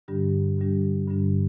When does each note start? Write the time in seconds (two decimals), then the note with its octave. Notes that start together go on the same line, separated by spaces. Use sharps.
0.08 G2 D3 G3 D4 G4
0.58 G2 D3 G3 D4 G4
1.08 G2 D3 G3 D4 G4